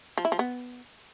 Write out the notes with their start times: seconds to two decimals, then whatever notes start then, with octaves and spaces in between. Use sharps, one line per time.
0.18 F3
0.25 E4
0.32 F3
0.39 B3